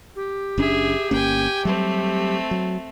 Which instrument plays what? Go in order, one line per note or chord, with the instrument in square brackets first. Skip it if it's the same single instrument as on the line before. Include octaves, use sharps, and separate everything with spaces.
[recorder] G4
[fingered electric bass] F#1 C#4 D4 [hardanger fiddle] G#4 E5
[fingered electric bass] G1 A#3 C#4 [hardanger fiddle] G5 G#5
[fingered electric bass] F#3 G3 [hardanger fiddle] A3 C4
[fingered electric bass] F#3